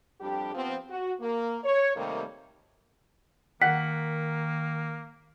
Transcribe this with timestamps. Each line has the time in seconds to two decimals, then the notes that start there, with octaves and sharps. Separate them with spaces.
0.21 F2 G3 D4 G4
0.55 F3 B3 C4
0.89 F#4
1.21 A#3
1.63 C#5
1.96 C3 D#3 G3 A3 A#3
3.62 D#3 A#3 F#5 B6